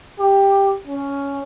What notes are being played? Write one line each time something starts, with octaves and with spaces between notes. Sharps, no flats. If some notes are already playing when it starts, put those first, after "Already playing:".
G4
C#4